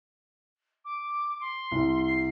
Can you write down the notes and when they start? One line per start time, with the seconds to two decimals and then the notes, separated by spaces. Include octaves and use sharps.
0.84 D6
1.40 C6
1.71 C2
2.05 C7